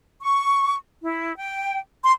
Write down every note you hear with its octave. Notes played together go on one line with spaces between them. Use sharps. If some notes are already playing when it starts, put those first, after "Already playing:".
C#6
E4
G5
C6